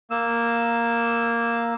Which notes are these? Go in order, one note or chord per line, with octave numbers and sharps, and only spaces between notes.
A#3 E6